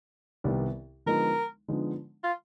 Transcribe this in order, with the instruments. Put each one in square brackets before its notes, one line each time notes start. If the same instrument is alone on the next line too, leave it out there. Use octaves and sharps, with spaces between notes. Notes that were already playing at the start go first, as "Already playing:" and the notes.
[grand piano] C2 C3 D#3 G3 B3
[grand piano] D3 F3 G#3 B3 D#4 [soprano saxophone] A#4
[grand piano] D3 F3 G#3 B3 D#4
[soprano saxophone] F4